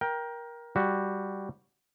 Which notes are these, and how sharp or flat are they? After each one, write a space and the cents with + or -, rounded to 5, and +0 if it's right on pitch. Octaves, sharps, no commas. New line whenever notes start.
A#4 +20 G5 +0
G3 +0 F#4 +0